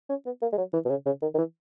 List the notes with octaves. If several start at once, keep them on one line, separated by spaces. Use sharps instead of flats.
C#4
B3
A#3
G#3
F#3
E3
B2
C#3
C#3
D#3
D#3
E3